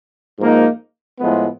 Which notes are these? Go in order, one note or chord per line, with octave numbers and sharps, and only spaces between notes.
G#2 F3 A#3 D#4
A2 F3 G#3 B3